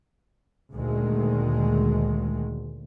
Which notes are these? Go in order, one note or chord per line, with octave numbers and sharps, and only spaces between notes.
D2 A#2 D#3 G#3